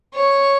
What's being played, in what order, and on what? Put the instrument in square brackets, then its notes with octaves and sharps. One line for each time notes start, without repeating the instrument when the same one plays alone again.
[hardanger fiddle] C#5